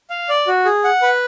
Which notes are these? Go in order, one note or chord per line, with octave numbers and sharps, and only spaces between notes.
F5
D5
F#4
G#4
F#5
B4